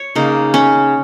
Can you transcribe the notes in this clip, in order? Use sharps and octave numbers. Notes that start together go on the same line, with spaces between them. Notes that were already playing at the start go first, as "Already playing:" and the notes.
Already playing: C#5
C#3 A#3 D#4
C#4